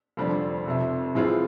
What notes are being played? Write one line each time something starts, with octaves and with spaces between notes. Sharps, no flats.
F1 F2 D3 G3 C4
F1 F2 C3
A2 E3 G#3 C4 F4